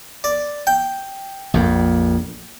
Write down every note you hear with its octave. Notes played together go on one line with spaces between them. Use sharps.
D5
G5
A#1 F2 A#2